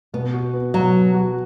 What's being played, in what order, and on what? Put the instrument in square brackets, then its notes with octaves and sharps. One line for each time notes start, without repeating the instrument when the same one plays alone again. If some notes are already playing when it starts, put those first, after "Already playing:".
[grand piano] B2 [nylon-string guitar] B3
[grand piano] F#4
B3
[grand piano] B2 [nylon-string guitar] F#3
[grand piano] B2
F#4